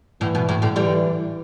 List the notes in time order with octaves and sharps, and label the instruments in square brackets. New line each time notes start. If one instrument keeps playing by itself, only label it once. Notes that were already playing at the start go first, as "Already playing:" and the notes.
[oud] A2 D3 [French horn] E3
[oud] B2
A2
A2 D3
[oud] D3 G3 [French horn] E3